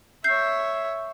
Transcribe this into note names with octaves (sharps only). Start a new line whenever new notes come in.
C#5 E5 G6 C7